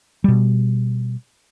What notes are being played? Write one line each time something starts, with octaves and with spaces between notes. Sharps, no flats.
B2 G3